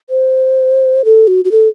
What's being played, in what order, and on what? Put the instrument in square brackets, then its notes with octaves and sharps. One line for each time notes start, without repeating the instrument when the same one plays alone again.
[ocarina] C5
A4
F#4
F#4
A4